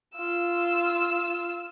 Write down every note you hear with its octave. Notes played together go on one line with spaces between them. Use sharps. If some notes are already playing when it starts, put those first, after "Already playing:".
F4 E6